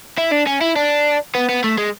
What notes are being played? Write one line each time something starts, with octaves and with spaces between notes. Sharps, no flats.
E4
D4
C#4
E4
D4
B3
B3
A3
G#3